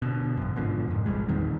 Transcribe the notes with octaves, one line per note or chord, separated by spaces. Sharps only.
B2 D3
G#1 F#2
G#2 B2 D3 F3
F2 G#2
D1 A1 G3 G#3
E2 A#2 D#3 C4